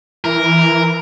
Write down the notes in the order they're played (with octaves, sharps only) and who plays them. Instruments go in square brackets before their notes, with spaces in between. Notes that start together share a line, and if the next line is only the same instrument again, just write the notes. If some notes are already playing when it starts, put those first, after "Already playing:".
[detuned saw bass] E3 [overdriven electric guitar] A#4